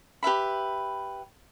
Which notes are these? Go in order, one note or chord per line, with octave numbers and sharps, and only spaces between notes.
G4 B4 E5 B5